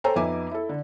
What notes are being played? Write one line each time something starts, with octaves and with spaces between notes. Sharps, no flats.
A4 C5 C#5 G5 G#5 A#5
F2 B3 D#4 E5 G#5 D6
E4 A4
D3